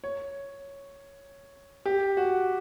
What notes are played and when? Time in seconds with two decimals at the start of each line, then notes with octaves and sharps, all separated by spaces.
0.04 C#5
1.85 G4
2.17 F#4